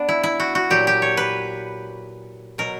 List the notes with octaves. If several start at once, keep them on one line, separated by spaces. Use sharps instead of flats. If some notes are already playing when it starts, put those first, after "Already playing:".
Already playing: B3 D4
E4
E4
F#4
F#4
A#2 F#3 G4
G4
C#5
B4
B2 F#3 A#4